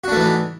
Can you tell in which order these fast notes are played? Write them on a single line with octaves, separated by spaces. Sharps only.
F#4 D4 A3 E3 D#4